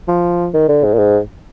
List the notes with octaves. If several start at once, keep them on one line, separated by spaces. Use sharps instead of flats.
F3
D#3
D3
G#2
A#2
G#2